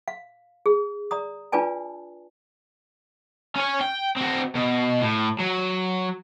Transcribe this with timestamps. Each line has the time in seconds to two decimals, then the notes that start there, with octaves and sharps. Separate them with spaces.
0.08 F5
0.66 G#4
1.11 D5 A#5 D#6
1.52 D4 F4 B4 D5 G#5 A5
3.56 C#4 C#5
3.81 G5
4.17 C4 F#4
4.55 B2
5.00 A2
5.40 F#3